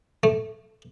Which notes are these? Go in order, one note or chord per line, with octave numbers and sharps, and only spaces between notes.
A3